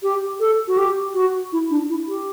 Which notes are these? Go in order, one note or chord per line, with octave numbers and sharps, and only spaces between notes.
G4
A4
F#4
G4
F#4
E4
D4
E4
G4